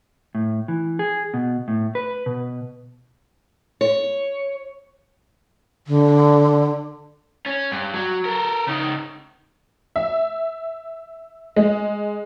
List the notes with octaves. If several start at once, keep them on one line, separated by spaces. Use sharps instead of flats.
A2
E3
G#4
B2
A2
B4
B2
C#5
D3
C#4
G2
F#3
A4 A#4
C#3 D#4
E5
G#3